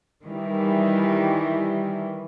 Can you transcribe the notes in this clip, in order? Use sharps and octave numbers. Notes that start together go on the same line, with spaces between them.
D#3 E3 G3